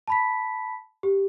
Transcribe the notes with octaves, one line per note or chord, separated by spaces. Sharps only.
A5 B5 B6
G4